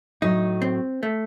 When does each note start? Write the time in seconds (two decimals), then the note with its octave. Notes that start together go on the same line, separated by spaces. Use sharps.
0.22 A2 F#3 A3 D#4
0.62 C4
1.03 A3